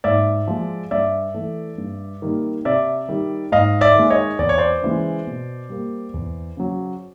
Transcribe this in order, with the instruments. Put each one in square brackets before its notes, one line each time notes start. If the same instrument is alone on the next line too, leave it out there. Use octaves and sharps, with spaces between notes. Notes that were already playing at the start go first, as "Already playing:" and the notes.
[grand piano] G#2 D5 E5
F3 G#3
G2 D5 E5
E3 A3
G2
D#3 G3 A#3
C3 D5 E5
D#3 G3
G#2 D#5 F5
D5 E5
D#3 G#3
C#5 D#5
E2 D5
C#5
C5 D5
C#3 E3 G#3
B2
G3 A#3
E2
C#3 F#3